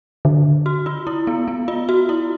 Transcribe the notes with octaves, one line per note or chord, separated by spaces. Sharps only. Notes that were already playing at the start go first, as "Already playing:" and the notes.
D3
F#4
F4
E4
B3
B3
F4
F#4
E4